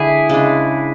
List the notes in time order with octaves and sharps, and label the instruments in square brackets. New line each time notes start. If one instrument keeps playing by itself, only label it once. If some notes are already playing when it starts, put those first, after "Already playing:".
Already playing: [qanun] D3 G#3 D4 [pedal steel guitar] E4 G#4
[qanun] C#3 G#3 D4